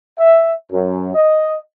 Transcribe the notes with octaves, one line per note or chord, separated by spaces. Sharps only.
E5
F#2
D#5